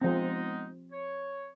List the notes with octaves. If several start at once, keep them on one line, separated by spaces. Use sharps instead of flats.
F3 G#3 B3 C4 D#4
C#5